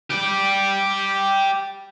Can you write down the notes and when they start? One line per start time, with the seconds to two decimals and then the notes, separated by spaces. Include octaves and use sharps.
0.11 G4 D5